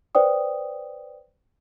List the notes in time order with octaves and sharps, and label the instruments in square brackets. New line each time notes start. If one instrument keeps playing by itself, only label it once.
[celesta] B4 C5 D5 G5 D#6